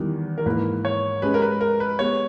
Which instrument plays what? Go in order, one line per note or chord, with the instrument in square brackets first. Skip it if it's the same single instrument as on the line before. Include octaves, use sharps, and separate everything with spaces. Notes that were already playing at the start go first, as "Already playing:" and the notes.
Already playing: [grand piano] E2 D#3 G3
[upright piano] A#4
[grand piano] G#2 E3 A#3 [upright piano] B4
[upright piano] C#5
[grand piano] G#3 C#4 G4 [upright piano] B4
[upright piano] A#4
B4
A#4
B4
[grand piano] G#3 B3 G4 [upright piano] C#5